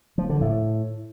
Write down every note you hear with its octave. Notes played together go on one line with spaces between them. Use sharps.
F3
D3
A2